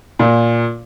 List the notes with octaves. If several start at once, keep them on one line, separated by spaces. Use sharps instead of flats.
A#2